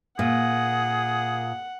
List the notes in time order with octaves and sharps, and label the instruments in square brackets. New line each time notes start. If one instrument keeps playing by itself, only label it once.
[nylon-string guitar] A#2 [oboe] G#4 [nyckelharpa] F#5